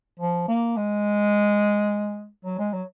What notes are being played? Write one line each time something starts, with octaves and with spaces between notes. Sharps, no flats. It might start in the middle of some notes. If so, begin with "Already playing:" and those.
F3
A#3
G#3
F#3
G#3
F#3